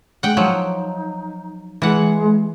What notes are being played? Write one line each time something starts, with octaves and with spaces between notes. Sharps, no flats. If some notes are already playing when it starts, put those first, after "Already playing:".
G#3 F#5 G5
F3 F#3 D#4
E3 G#3 F#5